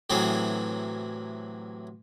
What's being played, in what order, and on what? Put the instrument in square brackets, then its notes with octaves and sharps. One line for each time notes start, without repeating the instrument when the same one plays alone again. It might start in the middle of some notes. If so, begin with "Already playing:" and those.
[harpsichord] A2 C3 E3 F#3 B3 G#4